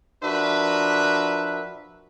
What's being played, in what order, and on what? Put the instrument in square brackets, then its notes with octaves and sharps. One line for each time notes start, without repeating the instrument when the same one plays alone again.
[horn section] F3 D4 F#4 A#4 B4 E5